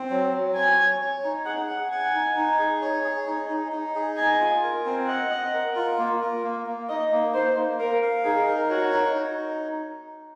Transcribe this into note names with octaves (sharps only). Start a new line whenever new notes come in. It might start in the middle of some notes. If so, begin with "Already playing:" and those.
Already playing: C4
F#3
F#3
C#5 G#5
C#5
C#5
D#4
G#4 F#5
F#5
F#5 G#5
D#4
D#4
G#4
C#5
G#4
D#4
D#4
D#4
G#4
D#5 G#5
F4
A#4
C4
D#5 F#5
D#5
A#4
F4
A#3
A#4
A#3
A#3
D#4 D#5
A#3
D#4 C5
A#3
A#4 F5
F5
D#4 G#4
A#4
F#4 C#5
D#4
D#4